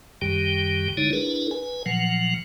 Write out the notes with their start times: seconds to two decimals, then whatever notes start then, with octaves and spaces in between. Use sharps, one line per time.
0.22 F#2 D#3 G3 G4 G5
0.97 D3 G#3 D#4 E4 C#5
1.13 D4 E4 G#4 A#4 B4
1.51 B4 G#5
1.86 A#2 F3 F#3 F#5